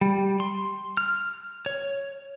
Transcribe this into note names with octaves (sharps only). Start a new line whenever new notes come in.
G3
C6
F6
C#5